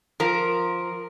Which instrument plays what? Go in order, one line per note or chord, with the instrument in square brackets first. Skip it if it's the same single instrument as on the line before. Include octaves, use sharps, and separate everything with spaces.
[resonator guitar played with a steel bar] F3 [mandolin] A#4